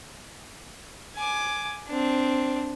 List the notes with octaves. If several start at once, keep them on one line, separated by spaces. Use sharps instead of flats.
G#5 D6
C4 D4